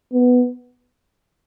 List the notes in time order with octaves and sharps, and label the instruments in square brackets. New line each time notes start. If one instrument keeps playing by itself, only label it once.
[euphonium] B3